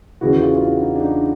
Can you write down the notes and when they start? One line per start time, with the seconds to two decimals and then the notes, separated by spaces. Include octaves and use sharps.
0.21 E2 C#3 E3 F#4
0.41 F4
0.55 F4
0.61 E4
0.81 D#4
0.95 D4
1.01 D#4